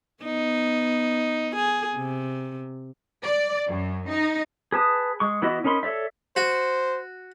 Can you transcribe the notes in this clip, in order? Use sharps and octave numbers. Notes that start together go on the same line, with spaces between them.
B3 D#4
G#4
C3
D5
F#2
D#4
G#4 B4 A5 D#6
G#3 C#6
E3 B3 E4 F#4 D#5
C#4 D#4 A#4 B5 C6
A4 C#5 D5 E5
F#4 C5